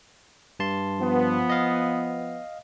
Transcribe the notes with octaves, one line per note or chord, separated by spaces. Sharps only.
G2 A5 C6
F3 B3
D#5 F5